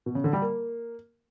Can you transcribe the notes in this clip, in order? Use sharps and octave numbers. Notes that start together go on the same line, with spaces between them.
B2
C#3
D3
G3
A#3